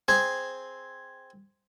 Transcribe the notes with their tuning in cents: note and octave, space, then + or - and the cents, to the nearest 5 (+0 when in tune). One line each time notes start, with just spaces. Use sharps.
C4 +0 G#4 +0 G#5 +0